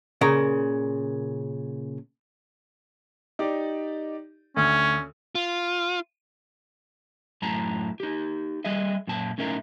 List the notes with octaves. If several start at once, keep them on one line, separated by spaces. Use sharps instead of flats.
A#2 C#3 A#4
D#4 G4 D5
D2 C#4
F4
F#2 A2 A5 A#5
D#4 G4
G3 G#4 D#5 E5
F#2 A#2 A5
A2 C#4 D#4 A#4 E5 A#5